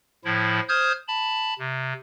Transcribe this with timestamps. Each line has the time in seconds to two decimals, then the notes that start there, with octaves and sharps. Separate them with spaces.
0.25 A2 F3 E4
0.69 C5 D#6 F6 G6 G#6
1.08 A5 B5
1.59 C3